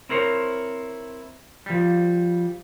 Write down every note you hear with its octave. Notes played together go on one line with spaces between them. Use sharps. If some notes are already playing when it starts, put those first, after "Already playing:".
C4 E4 A#4 C5 C#5
F3 G3